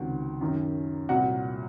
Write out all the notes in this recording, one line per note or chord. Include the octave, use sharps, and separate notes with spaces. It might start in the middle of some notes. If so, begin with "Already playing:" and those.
Already playing: C#2 C3 D#3 F#4
F#2 D#3
C2 A#2 F#4 F#5